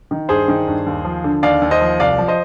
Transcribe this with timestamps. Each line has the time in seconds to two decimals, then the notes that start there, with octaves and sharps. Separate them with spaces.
0.11 D#3
0.29 G2 G#4 C5
0.48 D#3
0.67 G2
0.86 D#2
1.05 F3
1.24 D3
1.43 D#2 D5 F5
1.62 D#2
1.71 C5 D#5
1.81 F3
2.00 C2 D5 F5
2.18 F3
2.28 C5 D#5